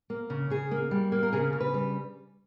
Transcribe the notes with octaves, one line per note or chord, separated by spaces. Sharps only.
A#3
C#3
C#3 G#4
A#3
G3
A#3
A#4
C#3 G#4
C#3
B4
G3